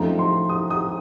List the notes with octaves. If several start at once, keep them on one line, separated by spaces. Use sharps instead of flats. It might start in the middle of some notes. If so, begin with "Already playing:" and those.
Already playing: F#2 F3 A3 C4 D#4 A#5
C6
D#6
D#6